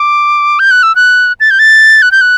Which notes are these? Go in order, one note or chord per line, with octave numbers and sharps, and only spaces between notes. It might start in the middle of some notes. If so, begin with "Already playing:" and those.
Already playing: D6
G6
F#6
E6
F#6
A6
G6
A6
F#6
G6
F#6